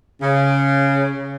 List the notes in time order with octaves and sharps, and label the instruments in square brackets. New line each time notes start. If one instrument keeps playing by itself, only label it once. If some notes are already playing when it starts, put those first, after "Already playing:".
[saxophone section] C#3